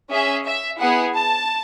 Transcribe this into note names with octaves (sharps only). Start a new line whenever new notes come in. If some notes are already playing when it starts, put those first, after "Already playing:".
C#4 G#4 E5
E5
B3 E4 G#4 F#5
A5